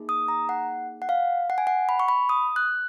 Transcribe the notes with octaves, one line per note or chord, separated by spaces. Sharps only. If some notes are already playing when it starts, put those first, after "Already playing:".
Already playing: A#3 D#4 G#4
D#6
A#5
F#5
F#5
F5
F#5
G#5
F#5
B5
C#6
B5
D#6
F#6